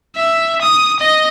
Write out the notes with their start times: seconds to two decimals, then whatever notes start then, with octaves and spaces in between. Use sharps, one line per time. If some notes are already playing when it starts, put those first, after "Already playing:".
0.16 E5
0.61 D#6
1.00 D#5